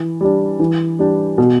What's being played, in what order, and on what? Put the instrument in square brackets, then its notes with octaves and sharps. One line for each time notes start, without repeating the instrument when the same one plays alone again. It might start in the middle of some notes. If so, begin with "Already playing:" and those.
Already playing: [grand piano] E3
G3 D4
E3
G3 D4 G4
B2